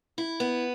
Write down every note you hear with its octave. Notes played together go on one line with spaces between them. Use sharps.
E4
B3